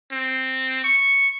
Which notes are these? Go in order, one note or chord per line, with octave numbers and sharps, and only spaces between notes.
C4
C#6